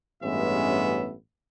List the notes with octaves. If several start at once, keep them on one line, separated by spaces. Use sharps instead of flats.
A1 G2 G#3 B3 C#4 E5